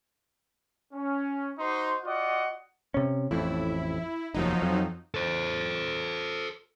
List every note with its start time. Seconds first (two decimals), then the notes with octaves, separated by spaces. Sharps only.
0.93 C#4
1.59 D#4 F#4 C5 C6
2.05 F4 F#4 D5 D#5 F#5
2.94 C3 C#4
3.31 A1 F2 A2 E4
4.34 F1 D#2 F3 F#3 D#4
4.62 F2
5.15 A4 C5